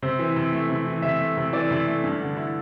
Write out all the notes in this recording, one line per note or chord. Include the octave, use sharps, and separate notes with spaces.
C3 C5
E3
C3
A3
C3
E3
C3 E5
A3
C3
E3 D5
C3
A3
G2
D3
E4